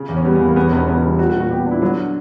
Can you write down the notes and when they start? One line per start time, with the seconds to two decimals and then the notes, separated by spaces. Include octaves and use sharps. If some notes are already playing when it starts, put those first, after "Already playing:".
Already playing: C#3
0.09 E2
0.16 C#4
0.25 G3 B3
0.35 B3
0.40 E2
0.46 A#3
0.56 E2 B3
0.67 C#4
0.71 E1 B3
0.77 C#4
0.88 C#3 B3
1.03 G3
1.19 G3 F#4
1.30 F#4
1.35 A#2
1.40 F#4
1.50 B3 G4
1.61 F#4
1.66 D4 E4
1.82 D3 F#3